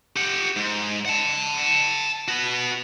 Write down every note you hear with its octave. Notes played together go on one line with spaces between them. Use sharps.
G4 F#5
G#2
F#5 A5
B3 F#4